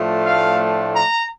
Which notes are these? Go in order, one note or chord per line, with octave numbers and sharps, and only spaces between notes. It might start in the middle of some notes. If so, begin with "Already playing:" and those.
Already playing: A2 F3 A3 D4 F4
F5
A#5